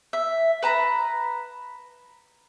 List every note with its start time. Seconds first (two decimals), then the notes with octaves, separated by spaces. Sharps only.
0.13 E5
0.63 B4 A5 A#5